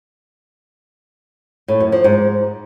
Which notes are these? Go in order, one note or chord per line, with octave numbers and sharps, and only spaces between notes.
A2
F#2
F3
G#2